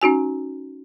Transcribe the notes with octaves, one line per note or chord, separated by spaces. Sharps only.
C#4 D#4 F#4 G#5